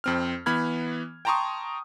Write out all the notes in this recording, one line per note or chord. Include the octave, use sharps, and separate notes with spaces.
F2 C4 F6
E3 B3 B5 F6 G#6
G5 A5 A#5 C6 C#6 D#6